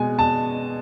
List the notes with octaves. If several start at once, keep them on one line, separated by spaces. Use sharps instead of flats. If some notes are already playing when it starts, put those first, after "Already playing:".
Already playing: B2 G#3 G#5
A5